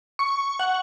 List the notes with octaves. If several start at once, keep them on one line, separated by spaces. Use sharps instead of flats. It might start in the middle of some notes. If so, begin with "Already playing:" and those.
C#6
F#5